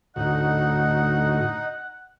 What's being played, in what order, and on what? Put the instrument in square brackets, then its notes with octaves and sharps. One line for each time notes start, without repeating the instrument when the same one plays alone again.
[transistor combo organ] D2 A2 F#4 [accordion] D#4 [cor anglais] F#5